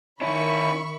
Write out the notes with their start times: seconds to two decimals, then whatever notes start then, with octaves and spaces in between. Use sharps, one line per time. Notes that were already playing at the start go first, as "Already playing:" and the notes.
0.21 D#3 C#4 E4 E5 B5 C#6